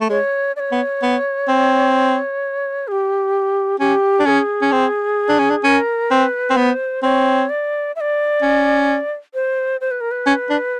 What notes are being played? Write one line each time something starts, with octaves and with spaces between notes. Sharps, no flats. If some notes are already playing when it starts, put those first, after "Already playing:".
A3
G#3 C#5
D5
C#5
B3
B3
C4
G#4
G4
C#4 G4
D4
C#4 G#4 A4
C#4
C4
D4
C#4
D4
C#4 A#4
C4 B4
C4
B3 C5
C4 C#5
D5
E5
D5
C#4
C5
C5
B4
A#4
B4
C#4
D4